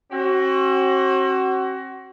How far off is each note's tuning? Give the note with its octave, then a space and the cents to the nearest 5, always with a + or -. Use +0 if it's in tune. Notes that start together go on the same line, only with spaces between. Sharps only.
C4 +45 F#4 +25